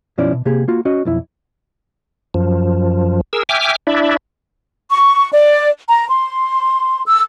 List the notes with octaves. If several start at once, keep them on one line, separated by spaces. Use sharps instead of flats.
F#2 B2 F3 C#4 E4 D5
B2
C3 A#3 G4 G#4
A#3 F4 F#4
C#4 F#4 D#5
B1 F2 E4
F#2 F3
G#4 A#4 E6
E5 G5 G#5 D6 F6
D4 E4 D5 E5
C#6
D5
A#5
C6
E6